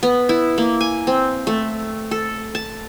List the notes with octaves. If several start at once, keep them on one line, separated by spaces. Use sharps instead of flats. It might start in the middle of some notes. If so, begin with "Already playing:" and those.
B3
E4
A#3
G#5
C4
A3
A4
A5